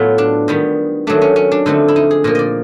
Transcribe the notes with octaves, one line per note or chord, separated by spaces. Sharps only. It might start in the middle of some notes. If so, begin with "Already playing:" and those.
Already playing: A2 F#3 B3 F4
D4
D#3 G3 B3
D#3 F#3 A3 D4
C#4
C#4
D4
D3 F3 A3 C4 D#4
E4
D#4
G#4
A#2 F3 A#3 A#4
D5 D#5